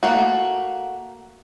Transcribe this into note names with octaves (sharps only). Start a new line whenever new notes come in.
A3 A#3 F#4